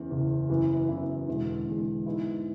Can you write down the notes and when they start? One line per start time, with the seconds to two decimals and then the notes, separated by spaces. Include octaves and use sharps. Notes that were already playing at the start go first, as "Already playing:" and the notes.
Already playing: F#1 E2 C#3
0.10 F#1 E2 C#3
0.49 F#1 F#2 E3 B3 E4
0.89 F#1 F#2 E3 B3 E4
1.28 E1 E2 D3 G#3
1.66 E1 E2 D3 G#3
2.06 G#2 G#3 B3 E4